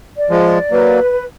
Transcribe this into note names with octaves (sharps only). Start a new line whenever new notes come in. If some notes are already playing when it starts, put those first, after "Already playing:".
D5
F3 G#3
D5
F#3 A#3 B4